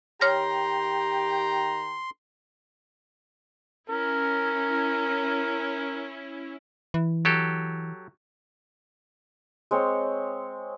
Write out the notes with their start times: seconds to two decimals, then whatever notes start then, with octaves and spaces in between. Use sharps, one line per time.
0.21 D#3 G4 C#5 G5 A#5 C6 F6 A#6
3.89 C#4 E4 A#4
6.94 E3
7.25 F#3 G4 A4
9.71 G#3 C4 C#5